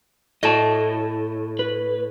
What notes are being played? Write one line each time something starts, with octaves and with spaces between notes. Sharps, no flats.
A2 D#5 A5
B4